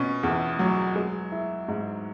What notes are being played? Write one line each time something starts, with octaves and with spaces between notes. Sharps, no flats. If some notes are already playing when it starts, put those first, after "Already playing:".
Already playing: B2 C#4
E2
F#3
G#3
E4
G#2